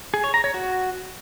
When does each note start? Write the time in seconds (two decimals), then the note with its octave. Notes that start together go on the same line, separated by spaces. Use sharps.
0.14 G#4
0.24 C#5
0.34 A#5
0.44 C#5
0.54 F#4